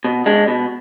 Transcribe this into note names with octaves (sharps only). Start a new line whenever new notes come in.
B2
G#3 D4
B2